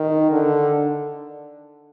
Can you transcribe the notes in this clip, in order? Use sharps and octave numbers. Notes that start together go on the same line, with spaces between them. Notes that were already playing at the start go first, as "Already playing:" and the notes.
Already playing: D#3
D3